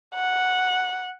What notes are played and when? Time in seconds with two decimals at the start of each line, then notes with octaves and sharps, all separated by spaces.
0.14 F#5